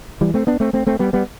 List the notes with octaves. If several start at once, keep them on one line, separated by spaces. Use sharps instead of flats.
E3 G3
A3 C4
B3 D4
A3 C4
A3 C4
A3 C4
G3 B3
G3 B3